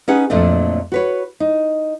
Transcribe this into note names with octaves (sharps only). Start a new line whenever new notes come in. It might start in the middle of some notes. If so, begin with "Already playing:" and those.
C#4 D#4 G#4 B4 F#5
F2 A#2 F#3 A3 D4
F#4 B4 C#5
D#4